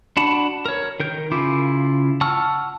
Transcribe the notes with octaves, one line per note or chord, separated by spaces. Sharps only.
D4 F#4 F#5 A5 B5
A#4 C#5
D#3 A#4 G6
C#3 E4 F4 D6
F#5 A5 C#6 E6 F6